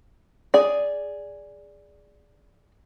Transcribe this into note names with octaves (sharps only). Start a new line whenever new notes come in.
G#4 D5